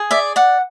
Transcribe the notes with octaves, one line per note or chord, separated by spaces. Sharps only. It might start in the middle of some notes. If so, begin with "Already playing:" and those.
Already playing: G#4
D5 E5
D5 F#5